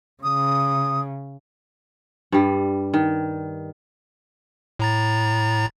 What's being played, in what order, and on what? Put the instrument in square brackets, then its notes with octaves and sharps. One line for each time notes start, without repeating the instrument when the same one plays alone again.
[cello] C#3 [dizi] D#6
[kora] G2 G3
D#3
[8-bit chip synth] A2 A#5 A6